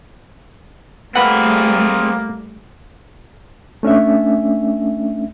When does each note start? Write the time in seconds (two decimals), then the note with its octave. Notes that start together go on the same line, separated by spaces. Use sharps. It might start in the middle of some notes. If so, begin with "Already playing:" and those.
1.16 G3 A3 A#3 C4 G#4 B4 F#5
3.83 A3 C#4 D4 E5